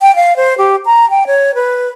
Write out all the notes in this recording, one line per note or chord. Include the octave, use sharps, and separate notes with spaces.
G5
F5
C5
G4
A#5
G5
C#5
B4